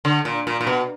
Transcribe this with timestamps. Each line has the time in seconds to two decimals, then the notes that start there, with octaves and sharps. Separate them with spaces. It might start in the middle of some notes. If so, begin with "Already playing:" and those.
0.05 D3
0.25 A#2
0.47 A#2
0.61 A#2
0.67 B2